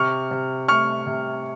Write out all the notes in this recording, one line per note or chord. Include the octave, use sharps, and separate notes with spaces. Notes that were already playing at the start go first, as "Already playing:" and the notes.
Already playing: C3 C#6 F6
C3
A3 C#6 F6
C3